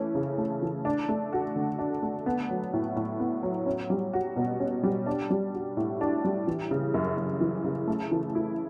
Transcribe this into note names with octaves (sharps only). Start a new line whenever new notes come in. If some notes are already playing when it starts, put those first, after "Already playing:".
Already playing: E3 A3 C#4
C#3
A3
E3
D4
A3
F#4
D3
D4
A3
B3
F#3
A2
A2
B3
F#3
C#4
G3
F#4
B2
C#4
G3
D4
G3
F#4
A2
D4
G3
E3
C#3
F#2
F#2
E3
C#3
A3
E3
E4